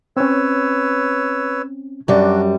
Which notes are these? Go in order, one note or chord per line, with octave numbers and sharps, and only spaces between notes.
C4 C#4 B4 C#5 E6
F#2 G3 D4 F#4